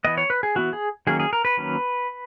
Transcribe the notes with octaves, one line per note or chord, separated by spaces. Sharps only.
E3 B3 D#5
C#5
B4
G#4
E3 B3 F#4
G#4
D#3 F#3 A#3 C#4 G#4
G#4
A#4
B4
D#3 F#3 A#3 C#4